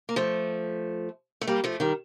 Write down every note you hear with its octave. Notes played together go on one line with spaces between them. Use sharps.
A#3
F3 A3
A3
G3 A#3
F3 A3
D#3 G3